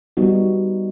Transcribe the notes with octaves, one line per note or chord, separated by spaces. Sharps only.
G3 B3 D#4 F#4